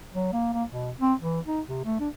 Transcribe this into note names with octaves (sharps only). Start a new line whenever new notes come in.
F#3
A#3
A#3
B2
C4
E3
D#4
C3
A3
D4